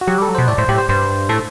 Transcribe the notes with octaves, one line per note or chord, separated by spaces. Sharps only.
F#4
F#3 G4
G3 A4
F#3
B2 C5
A2 D5
A2 C5
A2 G4
C5
G2 C5
A2 A4